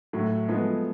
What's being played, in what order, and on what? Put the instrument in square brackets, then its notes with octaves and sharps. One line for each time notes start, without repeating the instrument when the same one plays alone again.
[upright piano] A2 [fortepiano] F#3 A3
[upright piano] F3 A3 [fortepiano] G#3 B3